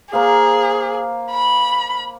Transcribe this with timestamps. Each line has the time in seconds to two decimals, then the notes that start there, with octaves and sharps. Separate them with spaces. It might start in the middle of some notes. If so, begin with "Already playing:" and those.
0.13 A#3 G#4 C5 F5
1.30 B5